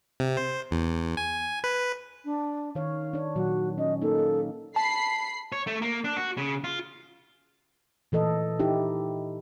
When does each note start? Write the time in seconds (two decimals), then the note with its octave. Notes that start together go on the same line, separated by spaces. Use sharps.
0.20 C3
0.37 C5
0.71 E2
1.17 G#5
1.64 B4
2.25 D4
2.75 D#3 C#5 F5
3.13 D4 C#5
3.35 A#2 D#3 F#3 F#4
3.78 C#4 D#5
4.02 A#3 D#4 A4
4.76 A5 B5 C7
5.52 C#5
5.67 A3
5.82 A#3
6.04 D4
6.17 F#4
6.37 C#3
6.64 F4
8.12 A#2 E3 A4 D#5
8.60 D#4 E4 G4